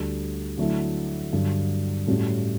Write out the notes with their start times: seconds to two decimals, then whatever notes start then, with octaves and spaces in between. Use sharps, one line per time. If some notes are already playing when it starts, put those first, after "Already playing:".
Already playing: D2 D3 G3
0.58 D3 F#3 A3 E4
1.33 G2 D3 F#3
2.07 A2 G3 C#4 F#4